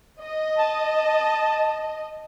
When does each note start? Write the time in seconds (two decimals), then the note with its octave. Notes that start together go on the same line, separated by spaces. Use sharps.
0.21 D#5
0.58 A5